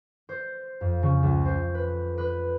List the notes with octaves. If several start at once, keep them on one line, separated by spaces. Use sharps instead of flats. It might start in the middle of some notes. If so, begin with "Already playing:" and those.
C5
F2
C#3
C#2
C5
B4
B4